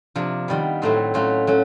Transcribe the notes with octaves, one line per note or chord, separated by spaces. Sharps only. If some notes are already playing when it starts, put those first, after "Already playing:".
C3 F3 A#3 D4
D#3 G3 B3
A2 F#3 A3 C4 D#4
F#3 A3 C#4 F4
F#3 A3 C#4